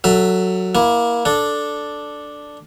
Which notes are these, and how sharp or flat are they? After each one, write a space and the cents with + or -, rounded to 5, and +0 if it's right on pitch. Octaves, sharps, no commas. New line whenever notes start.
F#3 +0 A4 +20 E5 +0
A#3 +20 E4 +0
D4 +0 A4 +0